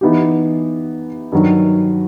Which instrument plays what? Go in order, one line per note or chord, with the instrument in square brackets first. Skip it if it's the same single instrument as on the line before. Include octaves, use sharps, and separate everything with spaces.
[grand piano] E3 B3 D#4 G4
G2 D#3 F#3